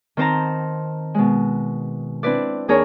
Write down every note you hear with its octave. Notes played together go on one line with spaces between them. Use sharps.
D#3 C4 C5 A5 A#5
B2 G#3
C4 D4 E4 B4 D5
D#2 D4 G#4 A#4 C#5